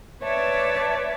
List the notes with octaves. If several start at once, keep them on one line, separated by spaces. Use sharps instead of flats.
B4 C#5 D5 E5 A5